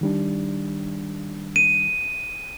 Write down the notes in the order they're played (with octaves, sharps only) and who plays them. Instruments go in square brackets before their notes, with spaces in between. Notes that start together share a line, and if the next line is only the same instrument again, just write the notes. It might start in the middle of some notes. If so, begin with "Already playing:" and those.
[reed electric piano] D#3 G3 D4
[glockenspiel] D#7